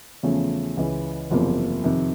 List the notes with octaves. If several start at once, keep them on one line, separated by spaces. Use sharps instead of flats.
E2 C#3 F3 A3 C#4
C#2 C#3 E3
F#1 E2 C3 F3 A#3
F2 C3 D#3